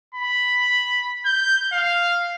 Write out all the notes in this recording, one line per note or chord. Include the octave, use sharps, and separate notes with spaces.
B5
G6
F5